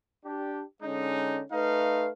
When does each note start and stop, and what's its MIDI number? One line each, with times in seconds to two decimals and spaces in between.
0.25 0.62 62
0.25 0.62 67
0.82 1.40 50
0.82 1.40 56
0.82 1.40 61
0.82 1.40 63
1.52 2.08 57
1.52 2.08 63
1.52 2.08 71
1.52 2.08 77